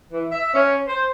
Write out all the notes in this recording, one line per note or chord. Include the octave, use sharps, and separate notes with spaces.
E3
E5
C#4
C5